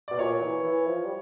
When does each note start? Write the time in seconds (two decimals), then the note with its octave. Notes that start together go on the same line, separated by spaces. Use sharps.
0.08 B2 D5
0.18 A#2 C#5
0.42 E3
0.63 E3
0.87 F3
1.05 G3